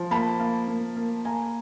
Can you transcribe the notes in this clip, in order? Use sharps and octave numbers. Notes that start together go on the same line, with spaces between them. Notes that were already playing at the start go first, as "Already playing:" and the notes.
Already playing: F3
A#3 A5 B5
A#3
A#3
A#3
A#3 G#5 A#5